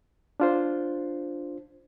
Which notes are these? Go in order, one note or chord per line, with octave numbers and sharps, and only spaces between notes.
D4 F4 C5